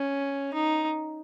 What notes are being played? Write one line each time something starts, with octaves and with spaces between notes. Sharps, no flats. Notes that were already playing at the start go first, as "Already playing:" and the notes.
Already playing: C#4
D#4